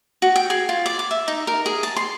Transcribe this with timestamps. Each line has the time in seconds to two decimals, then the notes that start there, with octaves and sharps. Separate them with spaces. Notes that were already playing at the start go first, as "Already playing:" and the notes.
0.22 F#4
0.36 G5
0.50 G#4
0.69 F4
0.86 D5
0.99 D6
1.11 E5
1.28 D#4
1.47 A#4
1.66 G#4
1.83 A5
1.96 C6